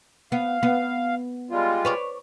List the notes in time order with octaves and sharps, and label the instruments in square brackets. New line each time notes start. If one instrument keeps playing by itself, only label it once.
[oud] B3 [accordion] F5
[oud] B3
[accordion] G3 G#3 F4
[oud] B4 C#5 D5